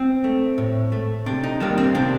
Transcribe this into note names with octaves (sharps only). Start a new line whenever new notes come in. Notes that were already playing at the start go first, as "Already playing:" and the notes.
Already playing: C4
A3
A2
A3
C3 D4
D#4
D#3 G3 A#3 D4
C4
C3 D4